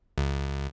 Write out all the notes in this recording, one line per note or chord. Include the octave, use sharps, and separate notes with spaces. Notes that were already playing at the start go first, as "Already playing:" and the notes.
C#2